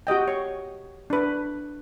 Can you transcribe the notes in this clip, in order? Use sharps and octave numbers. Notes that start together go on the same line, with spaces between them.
F#4 G4 D#5 G5
C#5 C#6
D4 B4